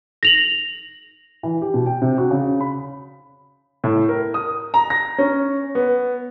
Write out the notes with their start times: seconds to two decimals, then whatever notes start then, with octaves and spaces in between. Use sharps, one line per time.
0.23 A#6 F7 F#7
1.43 E3
1.62 G4
1.74 B2
1.86 G5
2.02 C3
2.18 F#4
2.31 C#3
2.61 B5
3.84 A2
4.09 A#4
4.34 D#6
4.74 A#5
4.90 A#6
5.18 C#4
5.75 B3